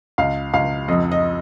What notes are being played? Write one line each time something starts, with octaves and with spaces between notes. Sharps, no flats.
C#2 F5
C#2 F5
F2 D#5
D#5